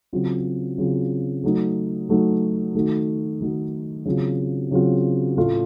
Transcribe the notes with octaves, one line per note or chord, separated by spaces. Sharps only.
C#3 F#3 C4 F4
C#3 F#3 C4 F4
F#3 A3 D#4
F#3 A3 D#4
D#3 A3 D#4 F#4
D#3 A3 D#4 F#4
C#3 F#3 C4 F4
C#3 F#3 C4 F4
A2 A3 C#4 F4